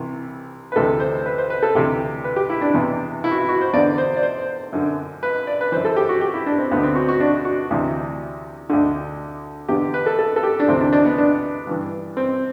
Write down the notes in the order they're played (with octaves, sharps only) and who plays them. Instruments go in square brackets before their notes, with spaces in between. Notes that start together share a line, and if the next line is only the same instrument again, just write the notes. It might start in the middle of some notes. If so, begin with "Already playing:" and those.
Already playing: [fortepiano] C2 C3 E3
B4
D2 C3 E3 A4
C5
B4
C5
B4
A4
D2 C3 E3 G4
B4
G4
E4
D4
E2 C3 E3
E4
F#4
E4
F#4
C5
E2 D3 D5
C5
D5
C5
F#2 D3
B4
D5
B4
F#2 E3 C5
A4
G4
F#4
G4
E4
D4
C4
D2 D3 B3
C4
F#4
F#4
D4
F#4
D2 C3 E3
D2 D3
E2 D3 G4
B4
A4
A4
A4
G4
D4
D2 C3 E3 C4
D4
D4
B3
D4
G2 E3
C4